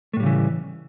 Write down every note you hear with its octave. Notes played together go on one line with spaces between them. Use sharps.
A2 C#3 E3 G3 A3